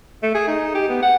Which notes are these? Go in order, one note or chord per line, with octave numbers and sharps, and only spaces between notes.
A3
G#4
D#4
G4
B3
F#5